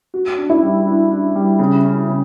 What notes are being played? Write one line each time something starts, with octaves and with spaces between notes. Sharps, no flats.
F#4
D4
E4
G3
D4
D4
G3
C#3
C#4
C#3